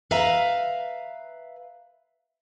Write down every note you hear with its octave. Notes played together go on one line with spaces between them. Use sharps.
B4 E5 F5 A#5